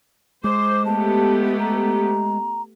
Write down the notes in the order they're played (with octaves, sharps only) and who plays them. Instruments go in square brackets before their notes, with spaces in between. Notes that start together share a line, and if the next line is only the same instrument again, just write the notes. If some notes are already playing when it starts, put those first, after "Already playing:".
[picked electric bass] G#3 [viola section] C5 [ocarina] D6
[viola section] A3 B3 G4 [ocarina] A5
[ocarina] A#5